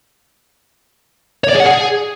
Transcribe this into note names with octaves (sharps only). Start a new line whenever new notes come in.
C#5
D5
G#4
F#5
G#4